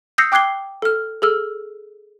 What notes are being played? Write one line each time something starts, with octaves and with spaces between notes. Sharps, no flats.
D#6 E6 G6 A#6 C7 C#7
G5 D6 F#6 G#6 C7 G7
A4 F6
G#4 A4 E6 F6